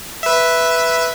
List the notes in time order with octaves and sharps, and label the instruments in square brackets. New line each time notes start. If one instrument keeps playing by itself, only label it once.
[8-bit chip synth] B4 E5